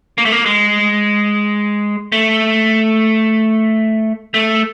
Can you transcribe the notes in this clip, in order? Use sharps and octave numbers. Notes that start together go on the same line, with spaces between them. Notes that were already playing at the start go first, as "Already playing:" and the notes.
A#3
A3
A#3
G#3
A3
A3